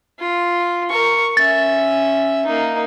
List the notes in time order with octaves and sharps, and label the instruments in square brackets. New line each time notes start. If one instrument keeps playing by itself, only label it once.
[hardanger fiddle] F4
A#4 C#6
[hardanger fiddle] C#4 E5 [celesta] A6
[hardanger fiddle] A#3 D#4